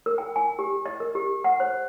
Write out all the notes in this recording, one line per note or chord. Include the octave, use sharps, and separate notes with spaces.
A#4
G5
G#5
G4
D#5
A#4
G4
F#5
C5